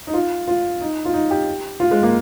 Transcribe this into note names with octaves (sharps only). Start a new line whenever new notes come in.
D#4
F4
F4
D#4
F4
D#4
G4
F4
G#3
A#3